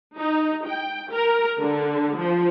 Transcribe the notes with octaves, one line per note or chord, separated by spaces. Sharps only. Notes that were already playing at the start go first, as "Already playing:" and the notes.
D#4
G5
A#4
D3
F3